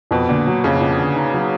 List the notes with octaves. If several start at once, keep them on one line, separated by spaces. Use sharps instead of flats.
F2 B2
A#2 D3
F#3
F2 C#3
F2
D3
D#4
F#3